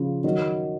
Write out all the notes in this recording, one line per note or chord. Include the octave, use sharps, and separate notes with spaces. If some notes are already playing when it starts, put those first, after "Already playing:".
Already playing: C#3 F3
D#3 F#3